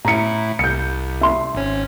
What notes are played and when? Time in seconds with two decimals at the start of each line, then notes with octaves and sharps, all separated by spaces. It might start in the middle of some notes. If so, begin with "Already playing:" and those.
0.05 A2 E4 A#5 C#7
0.59 C2 G6 C#7
1.21 E5 C6
1.55 G#1 C#4